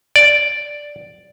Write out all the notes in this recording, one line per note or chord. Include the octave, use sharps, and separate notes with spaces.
D5